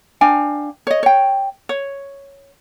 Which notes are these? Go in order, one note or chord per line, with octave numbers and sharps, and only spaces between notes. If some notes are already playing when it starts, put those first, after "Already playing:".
D4 F5 G5 G#5
C#5 D#5
C#5 G5
C#5